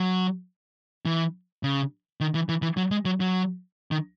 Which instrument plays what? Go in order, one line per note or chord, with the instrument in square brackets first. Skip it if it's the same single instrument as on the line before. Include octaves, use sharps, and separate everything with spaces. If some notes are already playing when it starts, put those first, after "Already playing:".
Already playing: [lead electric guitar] F#3
E3
C#3
D#3
E3
E3
E3
F#3
G#3
F#3
F#3
D#3